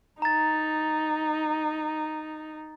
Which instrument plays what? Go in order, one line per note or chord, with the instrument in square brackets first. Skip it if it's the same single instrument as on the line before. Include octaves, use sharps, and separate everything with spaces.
[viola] D#4 [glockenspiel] A#5 A6